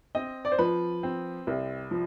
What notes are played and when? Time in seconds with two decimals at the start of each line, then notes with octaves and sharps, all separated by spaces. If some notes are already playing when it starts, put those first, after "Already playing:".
0.15 C4 D#5
0.45 D5
0.52 C5
0.59 F3 B4
1.03 C4
1.47 C2
1.91 F3